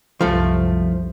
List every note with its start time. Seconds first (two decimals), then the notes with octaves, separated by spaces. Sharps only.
0.21 C2 F#2 F3 A3